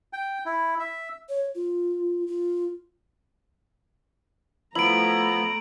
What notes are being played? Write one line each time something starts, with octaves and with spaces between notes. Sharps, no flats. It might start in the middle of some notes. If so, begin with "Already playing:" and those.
G5
E4
E5
C#5
F4
F4
F3 A3 B3 E4 A#5 D7 F#7